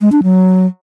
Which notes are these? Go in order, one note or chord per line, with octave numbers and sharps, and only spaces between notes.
G#3
D4
F#3